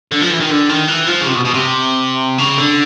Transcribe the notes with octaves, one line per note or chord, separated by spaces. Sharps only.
D3
F3
E3
D#3
D3
D#3
E3
F3
C#3
C3
B2
B2
C3
C#3
D3